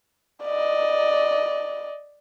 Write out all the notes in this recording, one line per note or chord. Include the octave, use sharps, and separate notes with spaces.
D5 D#5